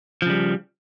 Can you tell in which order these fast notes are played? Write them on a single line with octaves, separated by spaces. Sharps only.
F3 C#3 G3